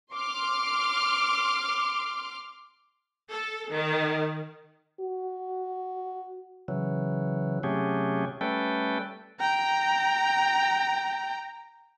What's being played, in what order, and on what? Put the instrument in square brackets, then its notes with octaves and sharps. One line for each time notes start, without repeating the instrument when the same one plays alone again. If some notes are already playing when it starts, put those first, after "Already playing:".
[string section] C6 D6 F6
A4
D#3
[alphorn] F#4
[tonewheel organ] C#3 E3 F#3
C3 F#3 A3 C#4 G4 G#4
G3 A3 C#4 A4 B4 G5
[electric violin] G5 A#5